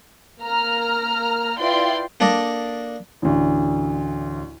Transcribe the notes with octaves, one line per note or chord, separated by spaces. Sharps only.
A#3 A#5 F6
E4 F4 B4 D5 G5 C6
A#3 D4 A4 D5 D#5
A1 D2